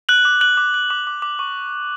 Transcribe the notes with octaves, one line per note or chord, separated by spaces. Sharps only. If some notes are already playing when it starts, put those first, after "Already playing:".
F#6 F#7
D6
F#6 F#7
D6
F#6
D6
D6
D6
C#6